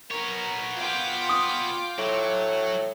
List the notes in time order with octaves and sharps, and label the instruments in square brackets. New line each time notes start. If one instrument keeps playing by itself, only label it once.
[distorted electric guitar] B3 C#5 [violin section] A#4
[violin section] F4 G5 D6
[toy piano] D#6
[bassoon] A2 [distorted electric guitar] F#3